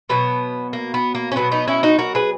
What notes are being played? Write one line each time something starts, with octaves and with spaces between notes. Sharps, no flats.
B2 F#3 B3
A#3
B3
A#3
C#4
B2 F#3 B3
B3 D#4
C#4 E4
D#4 F#4
F#4 A#4
G#4 B4